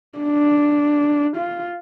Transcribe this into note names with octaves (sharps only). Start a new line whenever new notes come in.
D4
F4